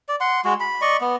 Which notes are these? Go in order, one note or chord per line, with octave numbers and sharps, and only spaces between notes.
D5
F#5 C6
G#3 F#4
B5
D5 D#5 C#6
B3